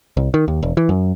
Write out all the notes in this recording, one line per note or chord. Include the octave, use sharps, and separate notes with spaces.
C2
D#3
D#2
E1
E3
F#2